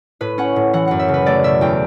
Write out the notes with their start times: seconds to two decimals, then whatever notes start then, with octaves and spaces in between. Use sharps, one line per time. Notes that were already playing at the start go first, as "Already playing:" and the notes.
0.21 A2 B4
0.38 C#4 F#5
0.56 A2
0.73 E3 F#5
0.87 F#2 F#5
1.00 E5
1.08 C#3
1.14 B4
1.26 A3 D5
1.44 B2 E5
1.61 E2 G5